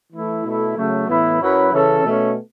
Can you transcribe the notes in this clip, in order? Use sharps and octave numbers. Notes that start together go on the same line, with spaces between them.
E3 A3 E4
B2 A3 E4 A4
C#3 F#3 A3
A2 E3 B3 E4
F#2 F#3 C#4 E4 B4
C#3 E3 C#4 A4
B2 A3 C#4